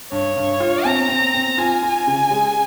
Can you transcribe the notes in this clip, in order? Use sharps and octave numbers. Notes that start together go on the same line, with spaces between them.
G2 C#5
G2
F4
C4 A#5
C4
C4
F4 G#5
F4
C#3
G#3